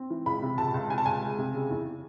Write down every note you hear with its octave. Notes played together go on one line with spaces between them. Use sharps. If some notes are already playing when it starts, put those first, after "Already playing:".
Already playing: C4
E3
C#2 B5
C3
C#2 A5
C#2
C3 G#5
A5
C#2 G#5
G#3
C3
C#3
E2